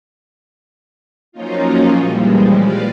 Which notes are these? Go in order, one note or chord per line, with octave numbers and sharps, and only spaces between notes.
F3 F#3 A#3 C#4 D#4 F4
A#2 E3 F3 G3 G#3
B4 D5 F5